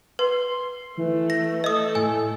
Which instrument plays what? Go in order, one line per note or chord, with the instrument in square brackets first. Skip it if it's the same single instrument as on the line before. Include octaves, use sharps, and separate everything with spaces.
[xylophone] B4 [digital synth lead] C6
[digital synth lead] E3 [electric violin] A3
[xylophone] A#6
[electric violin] A3 A4 [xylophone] D#5 D#6
[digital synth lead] A2 [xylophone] G#5